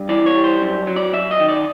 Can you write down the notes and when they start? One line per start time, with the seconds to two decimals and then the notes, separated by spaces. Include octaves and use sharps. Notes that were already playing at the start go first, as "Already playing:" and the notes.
Already playing: G2
0.09 E3 D5
0.26 C#5
0.34 G3
0.44 C5
0.61 F#2
0.87 F#3
0.96 D5
1.13 F#2 E5
1.31 D#5
1.40 D#3
1.48 D5